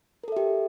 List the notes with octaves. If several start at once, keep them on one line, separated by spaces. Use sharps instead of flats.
G4 A4 A#4 E5